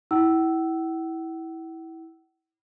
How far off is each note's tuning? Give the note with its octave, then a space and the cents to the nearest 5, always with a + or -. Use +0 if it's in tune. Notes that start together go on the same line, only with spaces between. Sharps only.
E4 -15 F#5 +45 E6 +0